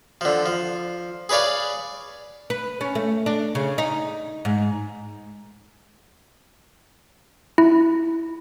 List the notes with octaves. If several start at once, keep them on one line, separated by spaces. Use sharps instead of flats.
D3 F3
F3
G#4 B4 C#5 D5 F5
B4
C#4
A3
D4
C#3
D#4
G#2
E4